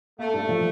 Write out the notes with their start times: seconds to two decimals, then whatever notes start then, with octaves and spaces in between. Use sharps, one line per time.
0.19 A3 A#3
0.34 G2
0.49 F3